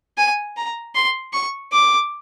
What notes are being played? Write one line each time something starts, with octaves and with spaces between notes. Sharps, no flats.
G#5
A#5
C6
C#6
D6